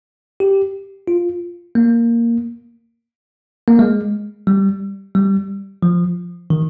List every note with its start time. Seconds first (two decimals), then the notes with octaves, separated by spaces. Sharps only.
0.40 G4
1.08 F4
1.75 A#3
3.68 A#3
3.79 G#3
4.47 G3
5.15 G3
5.83 F3
6.50 D#3